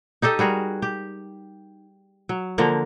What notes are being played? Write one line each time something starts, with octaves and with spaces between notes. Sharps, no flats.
D#4 G4 A4 D#5
G3 F#4 G#4 A#4
G4
F#3
D3 F3 A#3 A#4